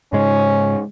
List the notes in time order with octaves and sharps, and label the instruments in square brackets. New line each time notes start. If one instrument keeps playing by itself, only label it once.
[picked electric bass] G#2 C#3 G#3 [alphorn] C#4